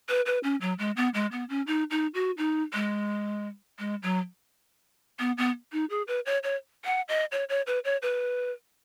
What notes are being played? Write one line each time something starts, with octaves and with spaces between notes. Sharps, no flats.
B4
B4
C#4
F#3
G#3
B3
G#3
B3
C#4
D#4
D#4
F#4
D#4
G#3
G#3
F#3
B3
B3
D#4
G#4
B4
C#5
C#5
F#5
D#5
C#5
C#5
B4
C#5
B4